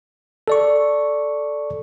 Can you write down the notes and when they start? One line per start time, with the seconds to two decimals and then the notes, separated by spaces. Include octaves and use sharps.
0.48 A4 D5 C#6